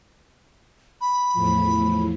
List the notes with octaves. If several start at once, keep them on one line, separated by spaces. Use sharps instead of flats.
B5
E2 A2 F3